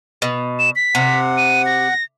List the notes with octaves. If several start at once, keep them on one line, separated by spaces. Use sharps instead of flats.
B2
E7
B6
C3 F#5
D#7
A#6